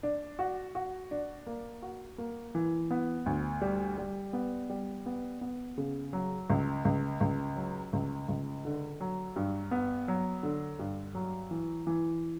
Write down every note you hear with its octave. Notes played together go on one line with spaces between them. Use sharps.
D4
F#4
F#4
D4
A#3
F#4
A#3
E3
B3
D2
G3
G3
B3
G3
B3
B3
C#3
F#3
C#2
C#2
C#2
F#3
C#2
C#2
D3
F#3
G2
B3
F#3
D3
G2
F#3
E3
E3